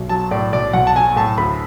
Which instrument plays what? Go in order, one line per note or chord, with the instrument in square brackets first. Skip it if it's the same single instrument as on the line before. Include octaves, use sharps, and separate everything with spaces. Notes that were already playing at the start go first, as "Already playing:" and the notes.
Already playing: [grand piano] B1
F#3 A5
A2 D5
B1 D5
B1 F#5
A5
F#3 G#5
A2 A5
D2 B5